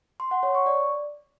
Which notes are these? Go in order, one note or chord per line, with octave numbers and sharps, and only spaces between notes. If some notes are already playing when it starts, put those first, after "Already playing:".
C6
F#5
C#5
C#6
D5